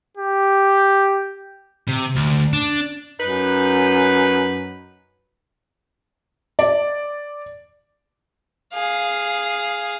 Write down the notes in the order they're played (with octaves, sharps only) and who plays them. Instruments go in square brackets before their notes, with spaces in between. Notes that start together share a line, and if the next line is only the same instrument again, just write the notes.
[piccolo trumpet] G4
[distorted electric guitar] C3
D2
D4
[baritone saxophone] F#2 [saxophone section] D#4 B4
[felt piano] D5
[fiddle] G#4 F5